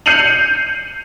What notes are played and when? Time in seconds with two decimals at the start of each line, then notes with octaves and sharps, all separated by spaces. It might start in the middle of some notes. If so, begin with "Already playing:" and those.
0.06 G6 C7 C#7 D#7 F7 F#7